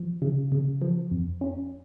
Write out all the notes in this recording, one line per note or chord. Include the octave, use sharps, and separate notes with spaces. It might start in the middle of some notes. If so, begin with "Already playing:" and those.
Already playing: F3
C#3
C#3
F3
F2
C#4